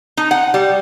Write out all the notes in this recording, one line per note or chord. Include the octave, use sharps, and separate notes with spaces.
D#4
F#5
G3